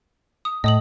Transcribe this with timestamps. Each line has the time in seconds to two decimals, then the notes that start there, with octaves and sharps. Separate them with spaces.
0.45 D#6
0.64 A2 D#5 D#6 F#7